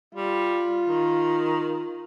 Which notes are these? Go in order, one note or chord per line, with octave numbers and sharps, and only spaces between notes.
G3 F4
D#3